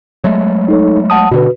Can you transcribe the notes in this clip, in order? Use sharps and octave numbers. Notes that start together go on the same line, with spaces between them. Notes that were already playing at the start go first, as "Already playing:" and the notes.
F#3 G#3 A3
D#4 A4 C#5
F#5 A5 D#6
B2 D3 F#4 B4